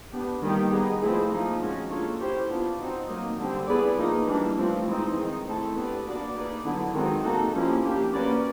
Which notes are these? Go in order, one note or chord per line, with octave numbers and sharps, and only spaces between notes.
B3 D4 G4
D#3 G3 A#3 D#4 G4
B3 D#4 G#4
F3 A3 C4 E4 G#4
F3 A#3 D#4
G#3 C#4 F#4
A#3 D4 F4 A4 C#5
C#4 E4 G4 C5
B3 D4 F4
C4 D#4 F#4
F#3 A#3 D#4
D3 G3 C4
B3 E4 G#4 B4 D5
F3 A#3 D#4
E3 G3 A#3 D4
F3 A3 C4
E3 G#3 C4 D#4
D#3 G#3 C4 D#4
A3 C4 E4 A4
B3 D4 G4 B4 D5
A#3 D4 F#4 B4 D5
A#3 D#4 G#4 B4 D5
D3 F#3 B3 E4
D#3 G#3 C4 D#4 F#4
A#3 D#4 F#4 A4
F3 A#3 C#4 E4 G4
A#3 D4 G4
A#3 C#4 F#4 B4 D5